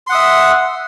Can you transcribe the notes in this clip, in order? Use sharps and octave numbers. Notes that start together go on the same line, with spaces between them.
E5 F#5 C6 D#6